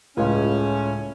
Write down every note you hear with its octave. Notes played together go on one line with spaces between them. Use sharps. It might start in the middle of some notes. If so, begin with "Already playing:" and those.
C#2 A2 G#3 C#4 F4